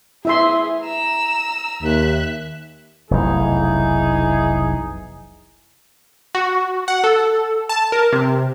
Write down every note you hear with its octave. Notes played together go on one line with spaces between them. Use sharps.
B3 E4 G#4 E5 C6
A#5 E6
D#2 E5 F#6
F1 B1 E3 D#4 G#4
F#4
F#5
A4
A5
A#4
C3